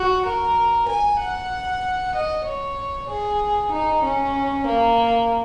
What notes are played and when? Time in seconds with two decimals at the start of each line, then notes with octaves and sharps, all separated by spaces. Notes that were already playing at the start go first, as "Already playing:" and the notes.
Already playing: F#4
0.26 A#4
0.88 G#5
1.20 F#5
2.15 D#5
2.45 C#5
3.09 G#4
3.72 D#4
4.03 C#4
4.66 A#3